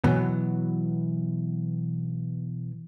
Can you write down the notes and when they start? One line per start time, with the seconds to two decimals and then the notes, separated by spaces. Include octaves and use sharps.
0.04 B2 E3 F#3 B3